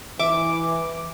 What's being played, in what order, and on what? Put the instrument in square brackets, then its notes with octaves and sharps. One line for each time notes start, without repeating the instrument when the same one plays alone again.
[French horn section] E3 [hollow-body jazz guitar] E5 [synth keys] D6